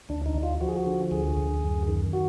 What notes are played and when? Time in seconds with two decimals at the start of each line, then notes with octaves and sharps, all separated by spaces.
0.09 D2 D4
0.26 D#4
0.35 D2
0.43 F4
0.61 F3 F#4
0.68 G#4
0.76 F#4
0.86 D3
1.11 D2 G#4
1.37 D2
1.63 F#2
1.88 D#3
2.13 F#4